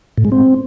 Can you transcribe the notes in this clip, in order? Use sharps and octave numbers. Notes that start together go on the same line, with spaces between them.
A2
G#3
C4